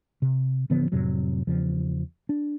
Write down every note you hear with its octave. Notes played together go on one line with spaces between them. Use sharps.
C3
A1 D3 F3 B3
F2 A2 C3 F#3
E2 C#3 F3
D4